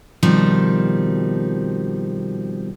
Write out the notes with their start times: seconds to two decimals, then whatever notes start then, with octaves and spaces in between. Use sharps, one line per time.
0.23 B2 D#3 F3 G3 C4